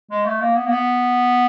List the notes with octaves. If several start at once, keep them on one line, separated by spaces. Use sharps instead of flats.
G#3
A3
A#3
B3
A#3
B3